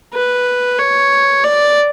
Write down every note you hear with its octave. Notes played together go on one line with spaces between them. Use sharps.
B4
C#5
D5